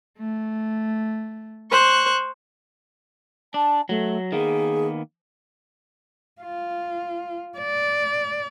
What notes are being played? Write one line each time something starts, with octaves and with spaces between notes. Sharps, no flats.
A3
C5 C#6 F#6
D4 A5
F#3 A3
D#3 A#3 B3 G#4
F4
D5